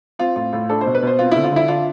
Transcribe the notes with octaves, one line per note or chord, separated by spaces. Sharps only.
C4 F4
A2 F4
A2 F4
D4 A4
C5
B2
B4
B2 C5
C4 F4
D3 E4
F4
D3 E4
D4 F4